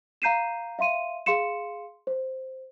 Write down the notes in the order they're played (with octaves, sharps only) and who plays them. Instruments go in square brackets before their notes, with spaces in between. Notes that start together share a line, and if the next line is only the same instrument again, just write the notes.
[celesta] F5 A#5 G6 C7 D#7 E7
E5 F5 C6 D#7
G#4 F5 C6 C#7 E7
C5